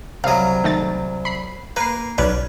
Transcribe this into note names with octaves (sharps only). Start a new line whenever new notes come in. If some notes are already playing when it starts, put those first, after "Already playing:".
C2 F#3 F5 D#6
D#3 A3 A6
B5 C7
A#3 B4 C7
B1 C#4 B4 D5